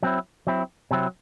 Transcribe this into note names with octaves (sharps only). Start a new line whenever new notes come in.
F#3 C4 E4
F#3 C4 E4
C3 F#3 C4 E4